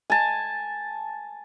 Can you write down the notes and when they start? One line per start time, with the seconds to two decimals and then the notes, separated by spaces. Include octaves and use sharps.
0.10 G#5 A5